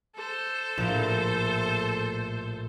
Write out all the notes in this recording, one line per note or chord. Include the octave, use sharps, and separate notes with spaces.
A4 C5
A#1 A2